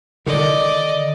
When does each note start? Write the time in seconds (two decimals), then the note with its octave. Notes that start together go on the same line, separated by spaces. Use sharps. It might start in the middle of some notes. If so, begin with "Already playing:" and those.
0.26 D3 D#3 D5 D#5